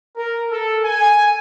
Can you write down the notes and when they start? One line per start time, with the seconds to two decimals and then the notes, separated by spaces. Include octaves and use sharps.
0.17 A#4
0.51 A4
0.84 G#5